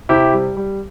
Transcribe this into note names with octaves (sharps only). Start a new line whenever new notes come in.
C3 E4 G4
G3
G3